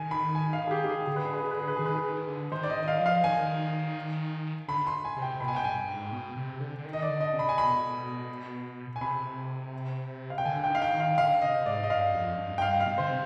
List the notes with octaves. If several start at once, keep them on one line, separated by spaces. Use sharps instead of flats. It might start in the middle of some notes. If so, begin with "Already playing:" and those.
Already playing: D#3 G#5
B5
G#5
F5
G#4
G4
G4
G#4
D3 G#4
B4
G#4
B4
G#4
B4
G#4
B4
D#3 G#4
B4
G#4
D#3
D3
D#3 C5
D5
D#5
D#3
D#5
F5
F3
F5
D#3 G#5
D3 B5
C6
G#5
C3
G5
B2 B5
G#5
G5
G2 G#5
G#2
B2
C3
D3
D3
D#3
D#5
D5
D3
D#5
C3
B5
G#5
B2 B5
G#5
C3 B5
F5
G5
D3 G#5
G5
D#3
F5
G5
D#3
F5
D3 F5
C3 D#5
G#2 D5
D#5
G2 F5
F2
G2
G5
G2 F5
G5
F5
B2
D3 C5
C3